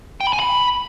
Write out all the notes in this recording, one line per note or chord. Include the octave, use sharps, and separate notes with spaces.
G5
B5
G#5
B5